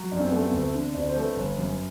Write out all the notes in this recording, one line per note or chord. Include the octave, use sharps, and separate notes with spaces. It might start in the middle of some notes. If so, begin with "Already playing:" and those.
Already playing: F#3
F#2 D4
C4
A3 B3
C4
D2
D3
D2 D4
C5
A3
B4
G1
F#2